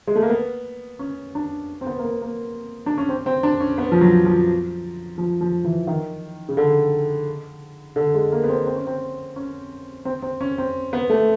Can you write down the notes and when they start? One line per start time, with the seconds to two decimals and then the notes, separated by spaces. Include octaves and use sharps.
0.07 G#3
0.15 A3
0.22 A#3
0.30 B3
0.99 C#4
1.35 D4
1.81 C4
1.87 B3
1.99 A#3
2.05 B3
2.22 A#3
2.86 D4
2.98 C#4
3.09 C4
3.26 C4
3.43 D4
3.60 C#4
3.78 B3
3.92 F3
4.01 F#3
4.25 F3
5.18 F3
5.41 F3
5.64 E3
5.87 D#3
6.49 C#3
6.57 D3
7.96 D3
8.14 G#3
8.32 A#3
8.44 B3
8.49 C4
8.66 C4
8.76 C#4
8.87 C4
9.36 C#4
10.05 C4
10.22 C4
10.41 C#4
10.58 C4
10.93 B3
11.10 A3